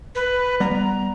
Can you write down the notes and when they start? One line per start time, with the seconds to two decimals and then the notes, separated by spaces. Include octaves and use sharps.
0.15 B4
0.60 G3 B3 A#5